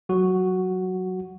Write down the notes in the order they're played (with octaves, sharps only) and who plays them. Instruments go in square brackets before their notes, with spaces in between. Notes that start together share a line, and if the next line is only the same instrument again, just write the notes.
[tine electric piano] F#3 F#4